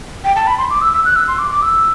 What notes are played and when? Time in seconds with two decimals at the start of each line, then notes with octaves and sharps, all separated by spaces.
0.24 G5
0.36 A5
0.47 B5
0.58 C6
0.70 D6
0.81 E6
0.93 E6
1.05 F#6
1.16 E6
1.28 C6
1.39 D6
1.51 D6
1.62 E6